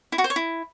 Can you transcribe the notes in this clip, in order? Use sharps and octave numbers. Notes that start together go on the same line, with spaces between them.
E4
F#4
C5
C#5
E4